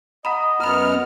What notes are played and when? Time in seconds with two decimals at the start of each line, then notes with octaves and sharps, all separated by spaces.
0.25 D#5 F#5 A#5 B5
0.60 F#2 B3 A#5 B5 F6